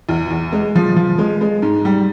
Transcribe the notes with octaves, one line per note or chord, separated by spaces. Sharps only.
E2
E2
G#3
F3
F3
G#3
G#3
G#2
G3